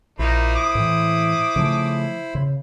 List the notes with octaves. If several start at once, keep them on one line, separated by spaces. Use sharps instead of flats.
A#1 A#3 D#4 E4 C5 B5
D6 D#6
A2 E3
C#3 F3 A3
C#3